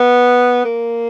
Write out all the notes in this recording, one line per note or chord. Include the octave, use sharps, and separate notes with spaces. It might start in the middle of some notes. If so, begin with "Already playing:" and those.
Already playing: B3
A#3